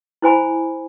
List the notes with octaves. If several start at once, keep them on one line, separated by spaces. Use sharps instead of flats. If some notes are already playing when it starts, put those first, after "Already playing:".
E4 C5 G#5 B5